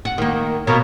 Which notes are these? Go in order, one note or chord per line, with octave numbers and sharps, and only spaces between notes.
F#4
D#3 A#3
B2 A#3 A#4 C#5